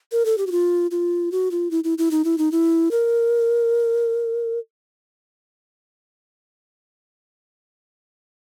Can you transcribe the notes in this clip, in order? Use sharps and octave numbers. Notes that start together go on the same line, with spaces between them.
A#4
A4
G4
F#4
F4
F4
F#4
F4
E4
E4
E4
D#4
E4
D#4
E4
A#4